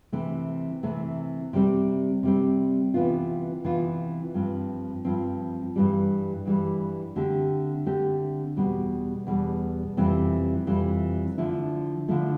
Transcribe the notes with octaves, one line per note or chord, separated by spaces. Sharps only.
C3 E3 A3
C3 E3 A3
C3 G3 C4
C3 G3 C4
C3 E3 B3 F4
C3 E3 B3 F4
G2 F3 C4
G2 F3 C4
G2 E3 G3
G2 E3 G3
D3 A3 C4 G4
D3 A3 C4 G4
E2 B2 G3
E2 B2 G3
F2 C3 E3 G3 C4
F2 C3 E3 G3 C4
D3 F3 A3 E4
D3 F3 A3 E4